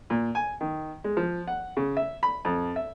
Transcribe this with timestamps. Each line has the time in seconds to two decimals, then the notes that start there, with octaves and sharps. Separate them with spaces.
0.10 A#2
0.35 G#5
0.61 D#3
1.04 G#3
1.17 F3
1.48 F#5
1.77 C#3
1.97 E5
2.23 B5
2.45 F2
2.76 E5